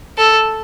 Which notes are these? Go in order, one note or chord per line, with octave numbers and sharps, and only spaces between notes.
A4